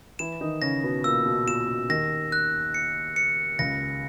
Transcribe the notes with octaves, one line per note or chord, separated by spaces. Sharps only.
E3 E4 E7
D#3 D#4
C#3 C#4 A#6
B2 B3
A#2 A#3 E6
B2
A#2 E7
B2
D#2 D#3 A#6
F#6
C#7
C#7
C#2 C#3 A#6